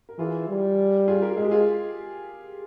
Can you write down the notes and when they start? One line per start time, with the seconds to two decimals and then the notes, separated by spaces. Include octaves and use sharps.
0.09 A#4
0.18 E3 F4 G#4
0.49 G3
1.08 F4 G#4
1.22 G4 A#4
1.37 G#3 G#4
1.44 G4
1.51 F4 G#4